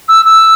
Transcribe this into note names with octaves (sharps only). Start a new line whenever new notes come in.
E6
E6